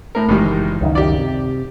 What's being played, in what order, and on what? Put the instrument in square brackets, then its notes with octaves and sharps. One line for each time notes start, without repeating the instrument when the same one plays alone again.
[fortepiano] A2 A#4
[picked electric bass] F#1 E3 [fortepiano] G#2 D#3 G3
[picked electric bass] C#2 F#2 D#3
[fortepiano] G4 D5
[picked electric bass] C3